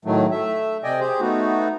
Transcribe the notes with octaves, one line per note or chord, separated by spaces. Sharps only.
A2 D#3 F#3 A3
A3 E5
C3 D5 D#5 G5 G#5
G4 G#4 C5
A3 B3 D#4 F#4